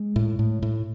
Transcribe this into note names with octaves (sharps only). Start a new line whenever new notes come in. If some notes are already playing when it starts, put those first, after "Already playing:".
Already playing: G#3
A2
A2
A2